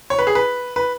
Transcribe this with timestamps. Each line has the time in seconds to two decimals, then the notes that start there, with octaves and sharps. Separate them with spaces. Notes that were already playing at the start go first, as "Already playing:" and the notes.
0.10 C#5
0.19 B4
0.27 G#4
0.35 B4
0.76 B4